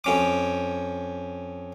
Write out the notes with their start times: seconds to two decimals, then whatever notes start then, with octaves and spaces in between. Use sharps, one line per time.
0.04 F2 C#4 D6